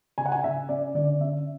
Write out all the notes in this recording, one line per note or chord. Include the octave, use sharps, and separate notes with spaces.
C#3 G#5
F#5
G#5
C#3 E5
C#4 D5
D3 D5
C#4 E5